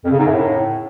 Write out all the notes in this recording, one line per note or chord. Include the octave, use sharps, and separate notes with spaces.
F2
C#3
G#2
F#2
A2